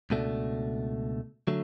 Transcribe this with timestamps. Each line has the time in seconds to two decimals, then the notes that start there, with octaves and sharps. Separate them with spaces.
0.10 C#2 B2 A3 D4
1.47 D3 F#3 A3